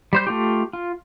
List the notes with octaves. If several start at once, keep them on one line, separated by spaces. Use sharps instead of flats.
G3 C5 G6
A3 F4 G4
F4